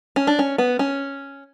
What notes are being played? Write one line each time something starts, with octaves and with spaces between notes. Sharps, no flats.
C#4
D4
C#4
B3
C#4